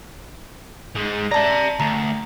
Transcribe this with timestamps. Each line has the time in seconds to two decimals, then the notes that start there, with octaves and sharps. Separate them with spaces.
0.95 G#2 G#3
1.31 D5 E5 A5 A#5
1.80 D2 A#5